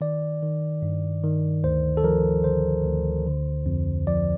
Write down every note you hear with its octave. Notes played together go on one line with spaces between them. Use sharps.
D#3 D5
D#3
G2
D#3
D2 C5
A4
F3 A#4
D3 C5
D2
D3
F2
F3 D5